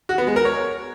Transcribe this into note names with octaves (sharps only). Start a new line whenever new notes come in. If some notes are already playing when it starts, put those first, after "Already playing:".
F#4
B3
G#3
A#4
C#5